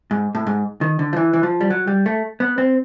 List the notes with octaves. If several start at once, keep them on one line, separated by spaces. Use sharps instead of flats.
G#2
A2
G#2
D#3
D3
F3
E3
E3
F3
G3
F#3
G3
A3
B3
C4